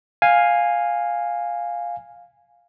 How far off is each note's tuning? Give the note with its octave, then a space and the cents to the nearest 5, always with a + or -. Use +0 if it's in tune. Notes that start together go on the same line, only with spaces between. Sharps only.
F5 +5 G#5 -10